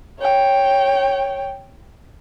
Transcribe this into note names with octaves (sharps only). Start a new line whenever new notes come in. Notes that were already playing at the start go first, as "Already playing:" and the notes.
C#5 G5